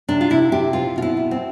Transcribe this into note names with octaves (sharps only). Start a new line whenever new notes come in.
C3 D4
F4
C3 E4
C3 G4
C4 F4
B2 F4
E4
B2
C4